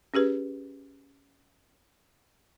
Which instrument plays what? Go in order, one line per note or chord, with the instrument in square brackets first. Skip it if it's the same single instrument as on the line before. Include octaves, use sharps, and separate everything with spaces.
[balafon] C#4 G4 G#4 B4